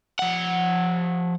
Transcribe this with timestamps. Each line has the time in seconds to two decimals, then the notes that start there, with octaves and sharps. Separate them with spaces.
0.19 F3 F#5